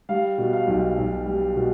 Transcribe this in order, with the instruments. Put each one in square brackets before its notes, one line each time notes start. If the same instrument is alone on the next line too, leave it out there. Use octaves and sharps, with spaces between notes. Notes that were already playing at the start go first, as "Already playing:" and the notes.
[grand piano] G3 F5
B2
F5
B1
B1
G3
B2